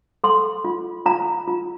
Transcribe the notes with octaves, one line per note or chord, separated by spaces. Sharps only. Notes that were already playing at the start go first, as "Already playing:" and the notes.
A4 C6
F4
F4 A#5
F4